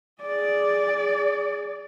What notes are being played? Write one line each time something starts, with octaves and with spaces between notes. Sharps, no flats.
G#4 D5